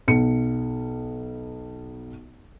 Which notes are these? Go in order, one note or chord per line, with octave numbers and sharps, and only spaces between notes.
B1 C#7